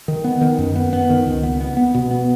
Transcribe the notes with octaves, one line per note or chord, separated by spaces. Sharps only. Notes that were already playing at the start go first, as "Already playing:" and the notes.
D#3
B3
D#3
F#2
B3
B3
D#3
C#2
B3
B3
B3
B2
B3